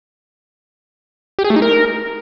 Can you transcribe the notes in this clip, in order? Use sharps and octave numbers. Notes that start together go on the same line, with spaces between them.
G4
G#4
A3
D#4
A#4